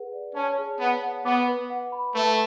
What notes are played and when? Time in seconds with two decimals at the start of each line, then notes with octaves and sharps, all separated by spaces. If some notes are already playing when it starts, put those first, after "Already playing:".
Already playing: G#4 B4 F#5
0.13 D5
0.35 C#4 A5
0.58 G#4
0.80 B3 C#5
1.02 F#5
1.25 B3 D6
1.48 B4
1.70 F#5
1.92 B5
2.15 A3 B4